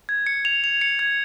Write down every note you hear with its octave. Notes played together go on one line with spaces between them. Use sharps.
G#6
C#7
F7
F7
C#7
G#6